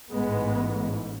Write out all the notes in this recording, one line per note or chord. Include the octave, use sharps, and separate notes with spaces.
A1 G#2 G#3 B3